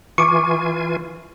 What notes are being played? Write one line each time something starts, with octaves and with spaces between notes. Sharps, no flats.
E3 F4 G#5 C#6 D6